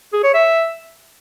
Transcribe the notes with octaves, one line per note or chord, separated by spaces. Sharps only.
G#4
C#5
E5